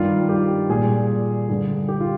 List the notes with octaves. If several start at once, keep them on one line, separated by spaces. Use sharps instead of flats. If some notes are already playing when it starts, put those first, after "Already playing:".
Already playing: G2 D#3 G3 F4
G4
A#2 G3 G#4
G2 D3 G3
G4
F4